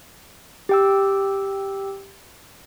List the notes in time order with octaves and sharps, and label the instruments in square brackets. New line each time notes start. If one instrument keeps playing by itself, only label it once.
[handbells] G4 G5 E6